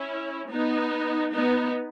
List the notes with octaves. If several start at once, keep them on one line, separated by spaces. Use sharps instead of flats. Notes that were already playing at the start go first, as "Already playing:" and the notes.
Already playing: C#4 E4
B3 D#4
B3 D#4